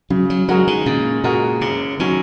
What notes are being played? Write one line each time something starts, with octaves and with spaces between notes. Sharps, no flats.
C#3 F#3
F#3
F#3 G#3 F#4 A#4
D#3
A#2 C#3
A#2 G#3 F#4 A#4
F#1 C#3
D#3 F#3 C#4